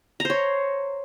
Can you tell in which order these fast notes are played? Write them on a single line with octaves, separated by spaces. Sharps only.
A#5 C5 C#5